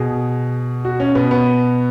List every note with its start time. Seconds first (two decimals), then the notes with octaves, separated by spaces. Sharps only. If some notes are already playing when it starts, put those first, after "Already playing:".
Already playing: B2 G#4
0.85 F#4
1.00 C#4
1.15 B2 B3
1.31 B3